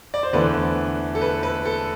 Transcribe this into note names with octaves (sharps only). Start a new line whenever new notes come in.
D5
C5
E2 D3 A3 B4
A4
B4
B4
A4